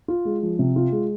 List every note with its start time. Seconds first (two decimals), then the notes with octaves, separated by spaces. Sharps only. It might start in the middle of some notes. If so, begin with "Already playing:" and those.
0.08 F4
0.25 G#3
0.43 F3
0.59 C3
0.76 F4
0.92 G#3